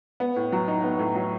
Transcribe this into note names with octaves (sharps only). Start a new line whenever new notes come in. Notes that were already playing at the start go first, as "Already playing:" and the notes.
B3
A2
F#3
D#4
B3
A2
F#3